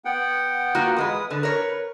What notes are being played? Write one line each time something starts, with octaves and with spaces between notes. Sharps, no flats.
B3 F#5 G5
A#3 F4 F#4
E2 G#3 B4 D#6
D3 B4
A#4 C#5